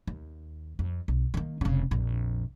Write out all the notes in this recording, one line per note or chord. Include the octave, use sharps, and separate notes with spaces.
D#2
F2
B1
D#3 A#3
F1 C#3
A#1 F2